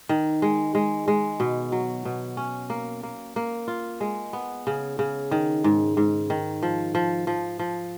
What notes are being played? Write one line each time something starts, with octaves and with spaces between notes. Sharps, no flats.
D#3
G#3
G#3
G#3
B2
F#3
B2
C#4
A#3
A#3
A#3
F4
G#3
B3
C#3
C#3
D#3
G#2
G#2
D#3
F3
F3
F3
F3